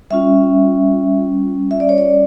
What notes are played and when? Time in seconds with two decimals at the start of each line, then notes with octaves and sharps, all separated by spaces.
0.10 G3 C#4 F4 E5
1.71 E5
1.80 D5
1.89 C#5
1.98 D5